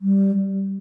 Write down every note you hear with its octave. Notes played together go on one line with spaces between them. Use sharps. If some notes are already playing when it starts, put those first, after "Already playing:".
G3